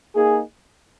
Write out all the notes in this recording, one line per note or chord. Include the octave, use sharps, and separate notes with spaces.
A#3 D#4 G#4